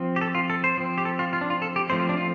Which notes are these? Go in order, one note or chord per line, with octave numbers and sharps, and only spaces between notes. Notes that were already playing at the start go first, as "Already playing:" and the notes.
Already playing: F3 C4
G4
A4
F4
A4
C5
F3 C4
G4
A4
F4
F4
D4
F4
A4
G4
F3 A3 C4 C5
F4
D4
F4